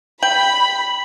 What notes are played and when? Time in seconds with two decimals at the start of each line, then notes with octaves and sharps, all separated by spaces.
0.23 G5 B5 F#7